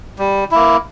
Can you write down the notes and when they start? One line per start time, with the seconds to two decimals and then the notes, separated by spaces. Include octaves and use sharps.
0.19 G3
0.51 A#3 E4